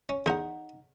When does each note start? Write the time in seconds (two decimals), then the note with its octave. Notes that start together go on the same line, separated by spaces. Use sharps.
0.09 C#4
0.26 E2 D#4 A#4 F#5